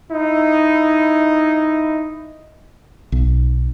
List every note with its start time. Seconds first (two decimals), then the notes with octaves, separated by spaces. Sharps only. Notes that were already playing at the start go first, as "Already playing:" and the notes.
0.12 D#4 E4
3.12 B1